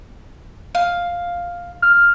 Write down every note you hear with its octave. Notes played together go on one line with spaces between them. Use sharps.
F5
F6